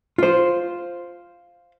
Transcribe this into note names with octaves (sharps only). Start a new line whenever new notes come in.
F4 C5